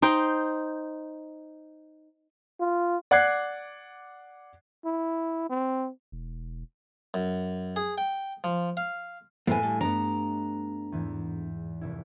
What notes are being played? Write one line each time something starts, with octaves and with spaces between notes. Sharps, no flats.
D#4 C5 G5
F4
D5 F#5 D6 F#6 G#6 C7
E4
C4
E1
F#2
G#4
G5
F3
F5
A2 A#3 B3 E4 G#5
G2 A4
G2 A3 B3 D4 A#5
E2 G#2 E3
F1 C2 E4